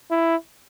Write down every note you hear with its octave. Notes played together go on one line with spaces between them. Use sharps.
E4